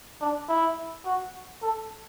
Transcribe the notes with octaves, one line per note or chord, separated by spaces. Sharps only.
D4
E4
F#4
A4